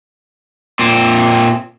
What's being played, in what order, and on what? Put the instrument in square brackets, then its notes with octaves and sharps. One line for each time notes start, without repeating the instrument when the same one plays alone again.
[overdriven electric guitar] A#2 C4